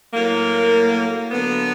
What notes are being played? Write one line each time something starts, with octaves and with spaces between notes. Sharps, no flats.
A2 F#3 A#3
D3 F#3 B3